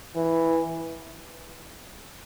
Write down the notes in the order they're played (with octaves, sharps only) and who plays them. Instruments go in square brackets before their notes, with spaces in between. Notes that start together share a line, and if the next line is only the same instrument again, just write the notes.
[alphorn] E3